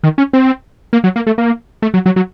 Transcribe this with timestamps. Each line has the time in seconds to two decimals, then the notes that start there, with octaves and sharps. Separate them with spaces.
0.04 D#3
0.18 C#4
0.33 C4
0.93 A#3
1.04 F#3
1.16 A#3
1.27 A3
1.38 A#3
1.82 A3
1.94 F#3
2.06 F#3
2.16 F#3